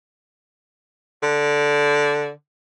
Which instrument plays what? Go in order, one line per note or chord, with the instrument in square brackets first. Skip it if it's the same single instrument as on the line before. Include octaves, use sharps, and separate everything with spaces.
[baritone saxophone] D3